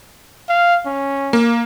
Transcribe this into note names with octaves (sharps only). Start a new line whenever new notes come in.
F5
C#4
A#3